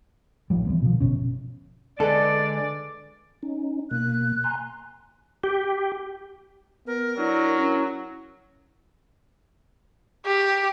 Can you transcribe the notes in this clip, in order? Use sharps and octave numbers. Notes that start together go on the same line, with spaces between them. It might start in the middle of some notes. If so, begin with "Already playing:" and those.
A1 D#3 F3 G3
E3 G3 B3 C4
B2 D3 F3
G1 B2 C#4
D3 G#3 A4 B4 D5
C#4 D#4
B2 A#3 F#6
G#5 A#5 C6
G4
B3 A#4
F#3 D4 E4
C#4
G4